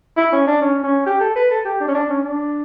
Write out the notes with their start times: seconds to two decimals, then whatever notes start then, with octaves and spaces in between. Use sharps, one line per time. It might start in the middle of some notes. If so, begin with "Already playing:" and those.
0.17 E4
0.32 C#4
0.47 D4
0.62 C#4
0.83 C#4
1.06 G4
1.20 A4
1.36 B4
1.51 A4
1.65 G4
1.80 D4
1.88 C#4
1.95 D4
2.10 C#4
2.24 D4